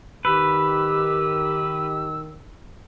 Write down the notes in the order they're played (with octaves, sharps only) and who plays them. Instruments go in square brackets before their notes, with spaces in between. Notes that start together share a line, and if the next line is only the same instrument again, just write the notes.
[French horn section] D#3 [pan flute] G4 [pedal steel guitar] B4 [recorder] E6